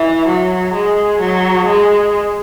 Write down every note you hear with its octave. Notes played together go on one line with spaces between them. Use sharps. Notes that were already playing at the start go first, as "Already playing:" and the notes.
Already playing: E3
F#3
G#3
F#3
G#3